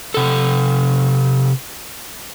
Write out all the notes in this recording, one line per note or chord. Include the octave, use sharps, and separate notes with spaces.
C3 A4